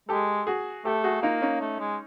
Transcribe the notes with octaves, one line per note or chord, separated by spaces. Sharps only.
G#3 G4 A4
F#4 G#4
A3 G4 A4
F#4 G#4
A#3 D#4 F4
C#4 D#4
A3
G#3